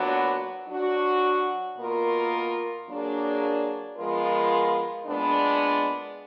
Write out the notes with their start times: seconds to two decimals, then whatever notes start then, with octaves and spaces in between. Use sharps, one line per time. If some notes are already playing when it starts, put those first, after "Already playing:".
Already playing: A#2 F#3 B3 D4 F#4
0.68 F#3 D4 F#4
1.78 B2 A#3 F4 A#4
2.87 F#3 A#3 D4 G#4
3.97 F3 G#3 B3 F4 A#4
5.06 A#2 G#3 B3 D4